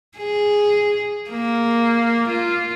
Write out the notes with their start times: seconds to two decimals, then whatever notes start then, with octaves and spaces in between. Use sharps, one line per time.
0.18 G#4
1.30 A#3
2.29 F4